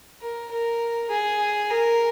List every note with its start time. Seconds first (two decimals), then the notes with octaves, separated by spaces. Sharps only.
0.21 A#4
0.51 A#4
1.10 G#4
1.69 A#4